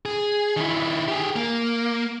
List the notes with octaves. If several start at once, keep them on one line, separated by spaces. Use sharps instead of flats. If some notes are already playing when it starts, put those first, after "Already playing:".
G#4
D#3 E4
G4 G#4
A#3